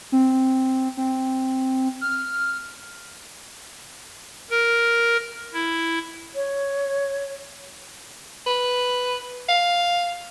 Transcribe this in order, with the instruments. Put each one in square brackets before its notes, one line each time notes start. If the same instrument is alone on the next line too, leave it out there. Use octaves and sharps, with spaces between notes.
[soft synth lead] C4
C4
F6
[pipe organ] A#4
E4
[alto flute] C#5
[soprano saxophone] B4
F5